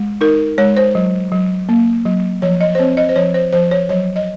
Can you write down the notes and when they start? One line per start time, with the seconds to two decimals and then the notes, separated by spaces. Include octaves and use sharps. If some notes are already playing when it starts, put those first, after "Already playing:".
Already playing: G#3
0.21 D#4 A#4
0.58 G#3 C#5
0.77 C5
0.95 F#3
1.32 F#3
1.69 A#3
2.05 F#3
2.42 F3 C#5
2.61 D#5
2.75 C5
2.79 C4 C#5
2.97 D#5
3.09 C5
3.16 F3 C#5
3.34 C5
3.53 F3 C5
3.71 C#5
3.89 F#3 C#5
4.16 D#5